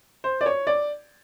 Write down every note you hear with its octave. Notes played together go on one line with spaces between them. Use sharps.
C5
D5
C#5
D5